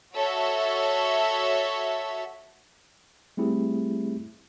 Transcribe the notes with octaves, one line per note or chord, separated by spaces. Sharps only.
F#4 A4 C#5 E5
G3 A3 C4 E4 G4 G#4